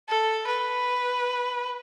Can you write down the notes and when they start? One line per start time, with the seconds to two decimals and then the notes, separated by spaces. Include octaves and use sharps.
0.09 A4
0.47 B4